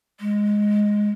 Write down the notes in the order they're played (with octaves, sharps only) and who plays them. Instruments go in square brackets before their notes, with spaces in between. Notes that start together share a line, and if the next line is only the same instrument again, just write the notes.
[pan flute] G#3